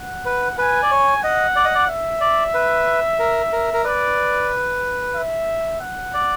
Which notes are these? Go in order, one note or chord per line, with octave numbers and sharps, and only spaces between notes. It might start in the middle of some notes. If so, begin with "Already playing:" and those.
Already playing: F#5
B4
B4 G#5
D5
C#5
D#5 F#5
D5
D#5
D5
E5
D5
B4
A#4
A#4
A#4
B4 D5
E5
F#5
D5